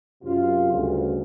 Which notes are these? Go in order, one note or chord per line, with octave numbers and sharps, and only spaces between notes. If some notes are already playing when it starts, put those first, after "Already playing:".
F#2 C3 F4
D2 G2 C#3